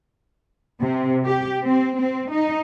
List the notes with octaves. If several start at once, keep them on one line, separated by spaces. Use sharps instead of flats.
C3
G4
C4
C4
D#4